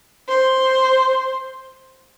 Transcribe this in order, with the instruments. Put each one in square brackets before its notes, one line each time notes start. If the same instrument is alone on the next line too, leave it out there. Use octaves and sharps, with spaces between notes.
[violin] C5